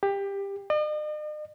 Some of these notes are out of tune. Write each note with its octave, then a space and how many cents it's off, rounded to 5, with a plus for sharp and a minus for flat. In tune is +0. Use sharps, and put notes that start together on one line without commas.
G4 +20
D#5 -45